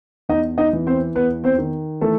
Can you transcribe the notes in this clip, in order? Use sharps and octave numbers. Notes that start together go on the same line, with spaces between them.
E2 D#4 D#5
D#4 D#5
E3
C4 C5
E2 B3 B4
C4 C5
D#3
E3 A3 A4